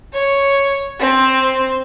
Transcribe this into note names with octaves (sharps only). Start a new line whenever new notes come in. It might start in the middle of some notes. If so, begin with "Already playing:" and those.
C#5
C4